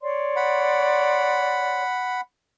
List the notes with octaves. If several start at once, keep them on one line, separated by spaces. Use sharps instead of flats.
C#5 D5 C6
F#5 B5